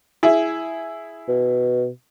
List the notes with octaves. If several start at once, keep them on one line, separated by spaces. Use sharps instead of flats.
E4 G#4 E5
B2